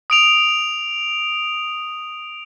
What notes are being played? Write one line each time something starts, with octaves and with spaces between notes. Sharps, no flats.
D#6 D7 F7